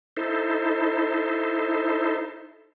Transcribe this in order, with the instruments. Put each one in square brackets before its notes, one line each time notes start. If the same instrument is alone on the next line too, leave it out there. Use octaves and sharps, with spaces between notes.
[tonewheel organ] D#4 E4 A4 C5